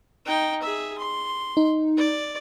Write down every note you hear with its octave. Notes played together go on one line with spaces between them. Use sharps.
D#4 G5
G#4 E5
C6
D#4
D5